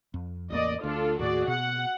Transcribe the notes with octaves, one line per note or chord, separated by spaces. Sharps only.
F2
A1 E2 A#3 D5 D#5
D2 D4 F4 A4
D#2 A2 F#4 G#4 D5
B2 F#5